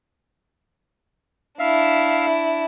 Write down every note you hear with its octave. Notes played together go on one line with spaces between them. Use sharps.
D4 E4 E5 F5